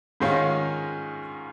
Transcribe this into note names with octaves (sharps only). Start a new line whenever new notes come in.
G#2 D#3 G#3 C#4 F4